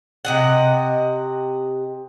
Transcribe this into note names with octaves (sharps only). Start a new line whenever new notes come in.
C3 D#5 F#5